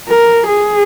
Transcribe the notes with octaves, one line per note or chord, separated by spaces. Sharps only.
A#4
G#4